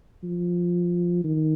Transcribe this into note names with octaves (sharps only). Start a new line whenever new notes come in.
F3
D#3